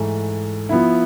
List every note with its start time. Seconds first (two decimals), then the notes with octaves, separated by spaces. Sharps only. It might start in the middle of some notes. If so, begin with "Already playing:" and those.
Already playing: G#2 E3 A3
0.69 F3 B3 E4